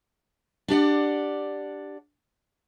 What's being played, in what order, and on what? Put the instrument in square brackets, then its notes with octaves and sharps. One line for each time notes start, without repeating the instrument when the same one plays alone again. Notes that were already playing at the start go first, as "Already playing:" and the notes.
[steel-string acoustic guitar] D4 G4 D5 F#5